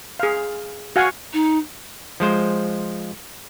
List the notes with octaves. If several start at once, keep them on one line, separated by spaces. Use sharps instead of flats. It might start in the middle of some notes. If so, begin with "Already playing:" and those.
G#4 F5
F#4 F5 F#5 G#5
D#4
F3 G#3 C5